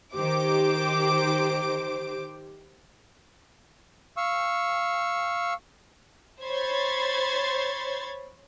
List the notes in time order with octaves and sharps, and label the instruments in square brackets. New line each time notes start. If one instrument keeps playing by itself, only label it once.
[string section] D#3 G4 C5 D6
[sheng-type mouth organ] F5 C#6 E6
[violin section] C5 C#5 B5 C6 G#6 A6